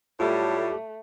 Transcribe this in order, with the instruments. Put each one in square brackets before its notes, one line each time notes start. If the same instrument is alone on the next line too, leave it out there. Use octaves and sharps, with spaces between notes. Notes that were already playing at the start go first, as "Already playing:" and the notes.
[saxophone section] A2 F#3 G3 [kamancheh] A3 [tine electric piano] F4 [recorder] G4